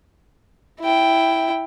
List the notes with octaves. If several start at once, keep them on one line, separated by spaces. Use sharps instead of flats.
E4 G5